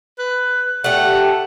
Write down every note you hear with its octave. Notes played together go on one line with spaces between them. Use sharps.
B4
A3 G4 F#5